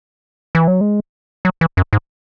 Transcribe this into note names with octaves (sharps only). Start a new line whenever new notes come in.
E3
F#3
G#3
F#3
E3
F#2
G#2